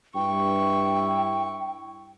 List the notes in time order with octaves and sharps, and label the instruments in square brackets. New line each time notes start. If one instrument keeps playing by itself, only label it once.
[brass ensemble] G2 E4 [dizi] G5 [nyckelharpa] C#6